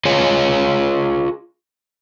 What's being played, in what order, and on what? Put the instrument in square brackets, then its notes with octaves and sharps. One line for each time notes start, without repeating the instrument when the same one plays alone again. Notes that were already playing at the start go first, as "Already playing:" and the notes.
[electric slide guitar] F4 G#4 C#5 D#5 F5